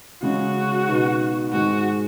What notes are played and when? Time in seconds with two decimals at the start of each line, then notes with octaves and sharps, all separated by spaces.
0.22 C#3 G#3 C#4 F#4
0.88 B2 B3 D#4
1.52 G#2 D#3 G#3 D#4 F#4